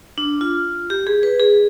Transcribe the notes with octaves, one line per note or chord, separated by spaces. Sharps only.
D4
F4
G4
G#4
B4
G#4